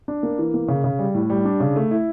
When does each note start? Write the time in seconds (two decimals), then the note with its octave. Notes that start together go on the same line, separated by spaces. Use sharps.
0.08 D4
0.23 A#3
0.39 E3
0.54 A#3
0.68 C#3
0.84 C#3
0.99 G3
1.15 A2
1.30 G3
1.45 D4
1.60 C#3
1.76 A3
1.91 E4